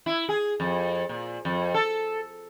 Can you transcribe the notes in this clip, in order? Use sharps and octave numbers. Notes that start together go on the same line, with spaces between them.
E4
G#4
F2
A#2
F2
A4